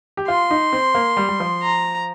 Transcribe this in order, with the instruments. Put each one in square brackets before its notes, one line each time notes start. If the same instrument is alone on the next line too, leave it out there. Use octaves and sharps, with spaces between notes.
[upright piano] G4
[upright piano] F4 [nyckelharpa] C6
[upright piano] D#4
C4
A#3
G3
G3
F3
[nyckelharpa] A#5